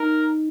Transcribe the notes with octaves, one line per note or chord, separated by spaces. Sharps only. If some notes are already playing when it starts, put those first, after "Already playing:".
Already playing: D#4 A#4